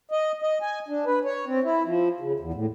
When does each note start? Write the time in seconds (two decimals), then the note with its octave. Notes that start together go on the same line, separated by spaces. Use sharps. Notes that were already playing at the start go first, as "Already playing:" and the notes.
0.12 D#5
0.42 D#5
0.62 G#5
0.88 D4
1.06 B4
1.25 C#5
1.46 C4
1.64 E4
1.86 F3
2.20 C#3
2.40 E2
2.54 A2